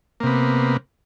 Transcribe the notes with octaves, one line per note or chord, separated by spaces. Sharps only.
C3 A#3 B3